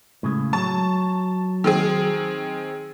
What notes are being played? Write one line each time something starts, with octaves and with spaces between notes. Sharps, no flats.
A2 C#3 G#3
F#3 C#5 A5
D#3 C4 G#4